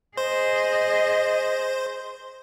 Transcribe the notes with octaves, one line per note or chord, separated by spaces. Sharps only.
G#4 C5 D#5